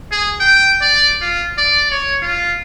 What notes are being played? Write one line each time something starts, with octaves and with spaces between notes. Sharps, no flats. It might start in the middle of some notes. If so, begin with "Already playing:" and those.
G#4
G5
D5
F4
D5
C#5
F4